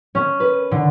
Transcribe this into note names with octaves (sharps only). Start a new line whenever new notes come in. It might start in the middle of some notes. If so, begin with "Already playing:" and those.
C#4
B4
D3